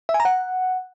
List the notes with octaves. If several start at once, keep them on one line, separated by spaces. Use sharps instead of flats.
E5
G#5
A#5
F#5